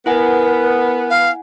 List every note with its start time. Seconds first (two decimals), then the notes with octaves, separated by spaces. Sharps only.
0.06 B3 E4 A#4 F#5 G#5
1.10 F5